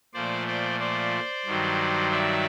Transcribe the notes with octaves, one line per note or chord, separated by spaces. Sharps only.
A#2 F3 A3 C5 D5
C5 D5
C5 D5
G2 D#3 F#3
D5 E5